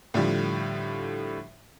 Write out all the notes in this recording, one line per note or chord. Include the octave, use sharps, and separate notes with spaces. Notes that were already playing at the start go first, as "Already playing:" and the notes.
A2 D3 F3 G3